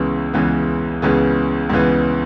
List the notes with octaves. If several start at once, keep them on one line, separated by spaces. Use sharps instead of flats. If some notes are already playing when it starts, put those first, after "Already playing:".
Already playing: C#2 C#3 E3 B3
C#2 C#3 E3 B3
C#2 C#3 E3 B3
C#2 C#3 E3 B3